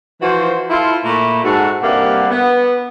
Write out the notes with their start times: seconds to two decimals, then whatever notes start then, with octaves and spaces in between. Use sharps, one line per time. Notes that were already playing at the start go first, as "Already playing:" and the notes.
0.21 E3 F3 F4 F#4 C5
0.69 E4 F4 A4
1.03 A#2 A3 B5
1.43 G#2 F#4 A4
1.82 G2 C3 G3 A#3 E5 F#5
2.30 B3